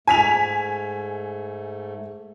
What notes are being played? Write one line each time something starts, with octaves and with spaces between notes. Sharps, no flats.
G#2 A3 G#5 B6 F7